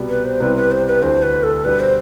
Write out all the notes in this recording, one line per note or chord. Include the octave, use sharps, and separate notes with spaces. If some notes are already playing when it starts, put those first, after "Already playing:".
Already playing: C2 B2 G3 B3
B4
C5
C2 C3 G3 C4 E4 B4
B4
C5
B4
D2 D3 A3 E4 C5
B4
A4
B2 G3 D4 B4
C5